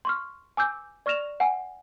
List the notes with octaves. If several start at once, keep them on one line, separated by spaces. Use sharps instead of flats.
C6 C#6 F6
G#5 D6 E6 G6
D5 C#6 F6 A#6 E7 F7
F#5 G#5